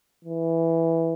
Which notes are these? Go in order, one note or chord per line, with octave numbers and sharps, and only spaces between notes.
E3